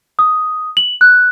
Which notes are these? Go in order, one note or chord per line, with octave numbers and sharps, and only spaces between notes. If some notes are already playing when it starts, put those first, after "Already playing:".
D#6
F#7
F#6